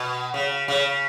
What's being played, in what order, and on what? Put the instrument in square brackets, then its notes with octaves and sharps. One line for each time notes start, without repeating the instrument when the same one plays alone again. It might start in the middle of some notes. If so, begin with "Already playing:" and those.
Already playing: [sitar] B2
C#3
C#3